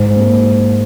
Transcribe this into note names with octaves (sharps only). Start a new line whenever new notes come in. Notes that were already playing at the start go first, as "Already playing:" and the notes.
Already playing: G#2
A#3